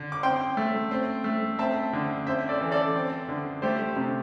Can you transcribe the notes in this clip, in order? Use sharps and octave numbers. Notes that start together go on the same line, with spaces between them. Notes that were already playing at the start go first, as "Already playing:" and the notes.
Already playing: D3
D6
C4 G5 C6
A3
C4
A3
C4 E5 A5
D3
C4 C5 E5
A4 D5
E3
A4 D5
C4
D3
A3 G4 C5
C3